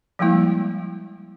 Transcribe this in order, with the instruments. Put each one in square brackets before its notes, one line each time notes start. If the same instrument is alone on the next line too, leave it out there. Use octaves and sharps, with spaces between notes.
[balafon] F3 G3 G#3 A#3 E4